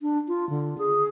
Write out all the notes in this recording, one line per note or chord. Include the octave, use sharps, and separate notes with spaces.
D4
F4
D3
G#4